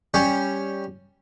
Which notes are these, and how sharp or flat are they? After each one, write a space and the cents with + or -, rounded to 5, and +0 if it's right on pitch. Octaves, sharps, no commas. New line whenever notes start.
G3 +5 C#4 +0